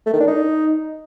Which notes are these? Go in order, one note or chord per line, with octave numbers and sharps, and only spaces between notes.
A3
D#3
D4
D#4